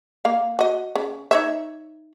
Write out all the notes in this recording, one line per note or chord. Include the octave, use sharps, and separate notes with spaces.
A#3 F5
F#4 D#5
C#3
D#4 C#5 E5